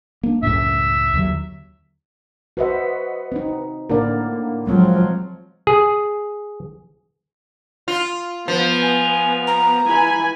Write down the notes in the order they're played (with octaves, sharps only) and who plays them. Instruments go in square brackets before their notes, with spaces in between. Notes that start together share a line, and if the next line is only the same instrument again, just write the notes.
[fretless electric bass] A#3 D4
[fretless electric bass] C#2 F#2 A2 [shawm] E5
[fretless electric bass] D#2 D3 F#3
[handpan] F#4 C5 E5 [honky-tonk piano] B4 D#5 F#5
[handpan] C4 D#4
[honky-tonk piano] A2 D3 A#3 [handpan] A#4 D5
[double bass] F3 F#3 [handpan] G#3 C4 F4
[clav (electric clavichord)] G#4
[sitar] F4
[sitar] F3 [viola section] B3
[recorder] G#5
A#5
[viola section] E3 G#5 B5